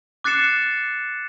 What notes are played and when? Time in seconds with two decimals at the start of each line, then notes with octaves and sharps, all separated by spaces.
0.24 D6 F#6 A6 C7 C#7 E7